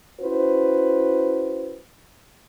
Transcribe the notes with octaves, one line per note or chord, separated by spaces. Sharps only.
C#4 E4 F#4 B4 C5